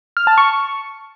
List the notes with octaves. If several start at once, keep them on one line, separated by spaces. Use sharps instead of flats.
F6
A5
C#6